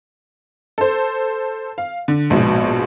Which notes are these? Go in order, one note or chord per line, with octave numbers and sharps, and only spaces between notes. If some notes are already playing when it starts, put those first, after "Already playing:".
A4 C5
F5
D3
A#1 G#2 B2